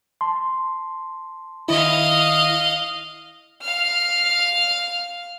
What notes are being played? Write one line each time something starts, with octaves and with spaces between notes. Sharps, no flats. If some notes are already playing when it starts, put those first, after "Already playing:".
A5 C6
D#3 E4 D#5 F5
F5 F6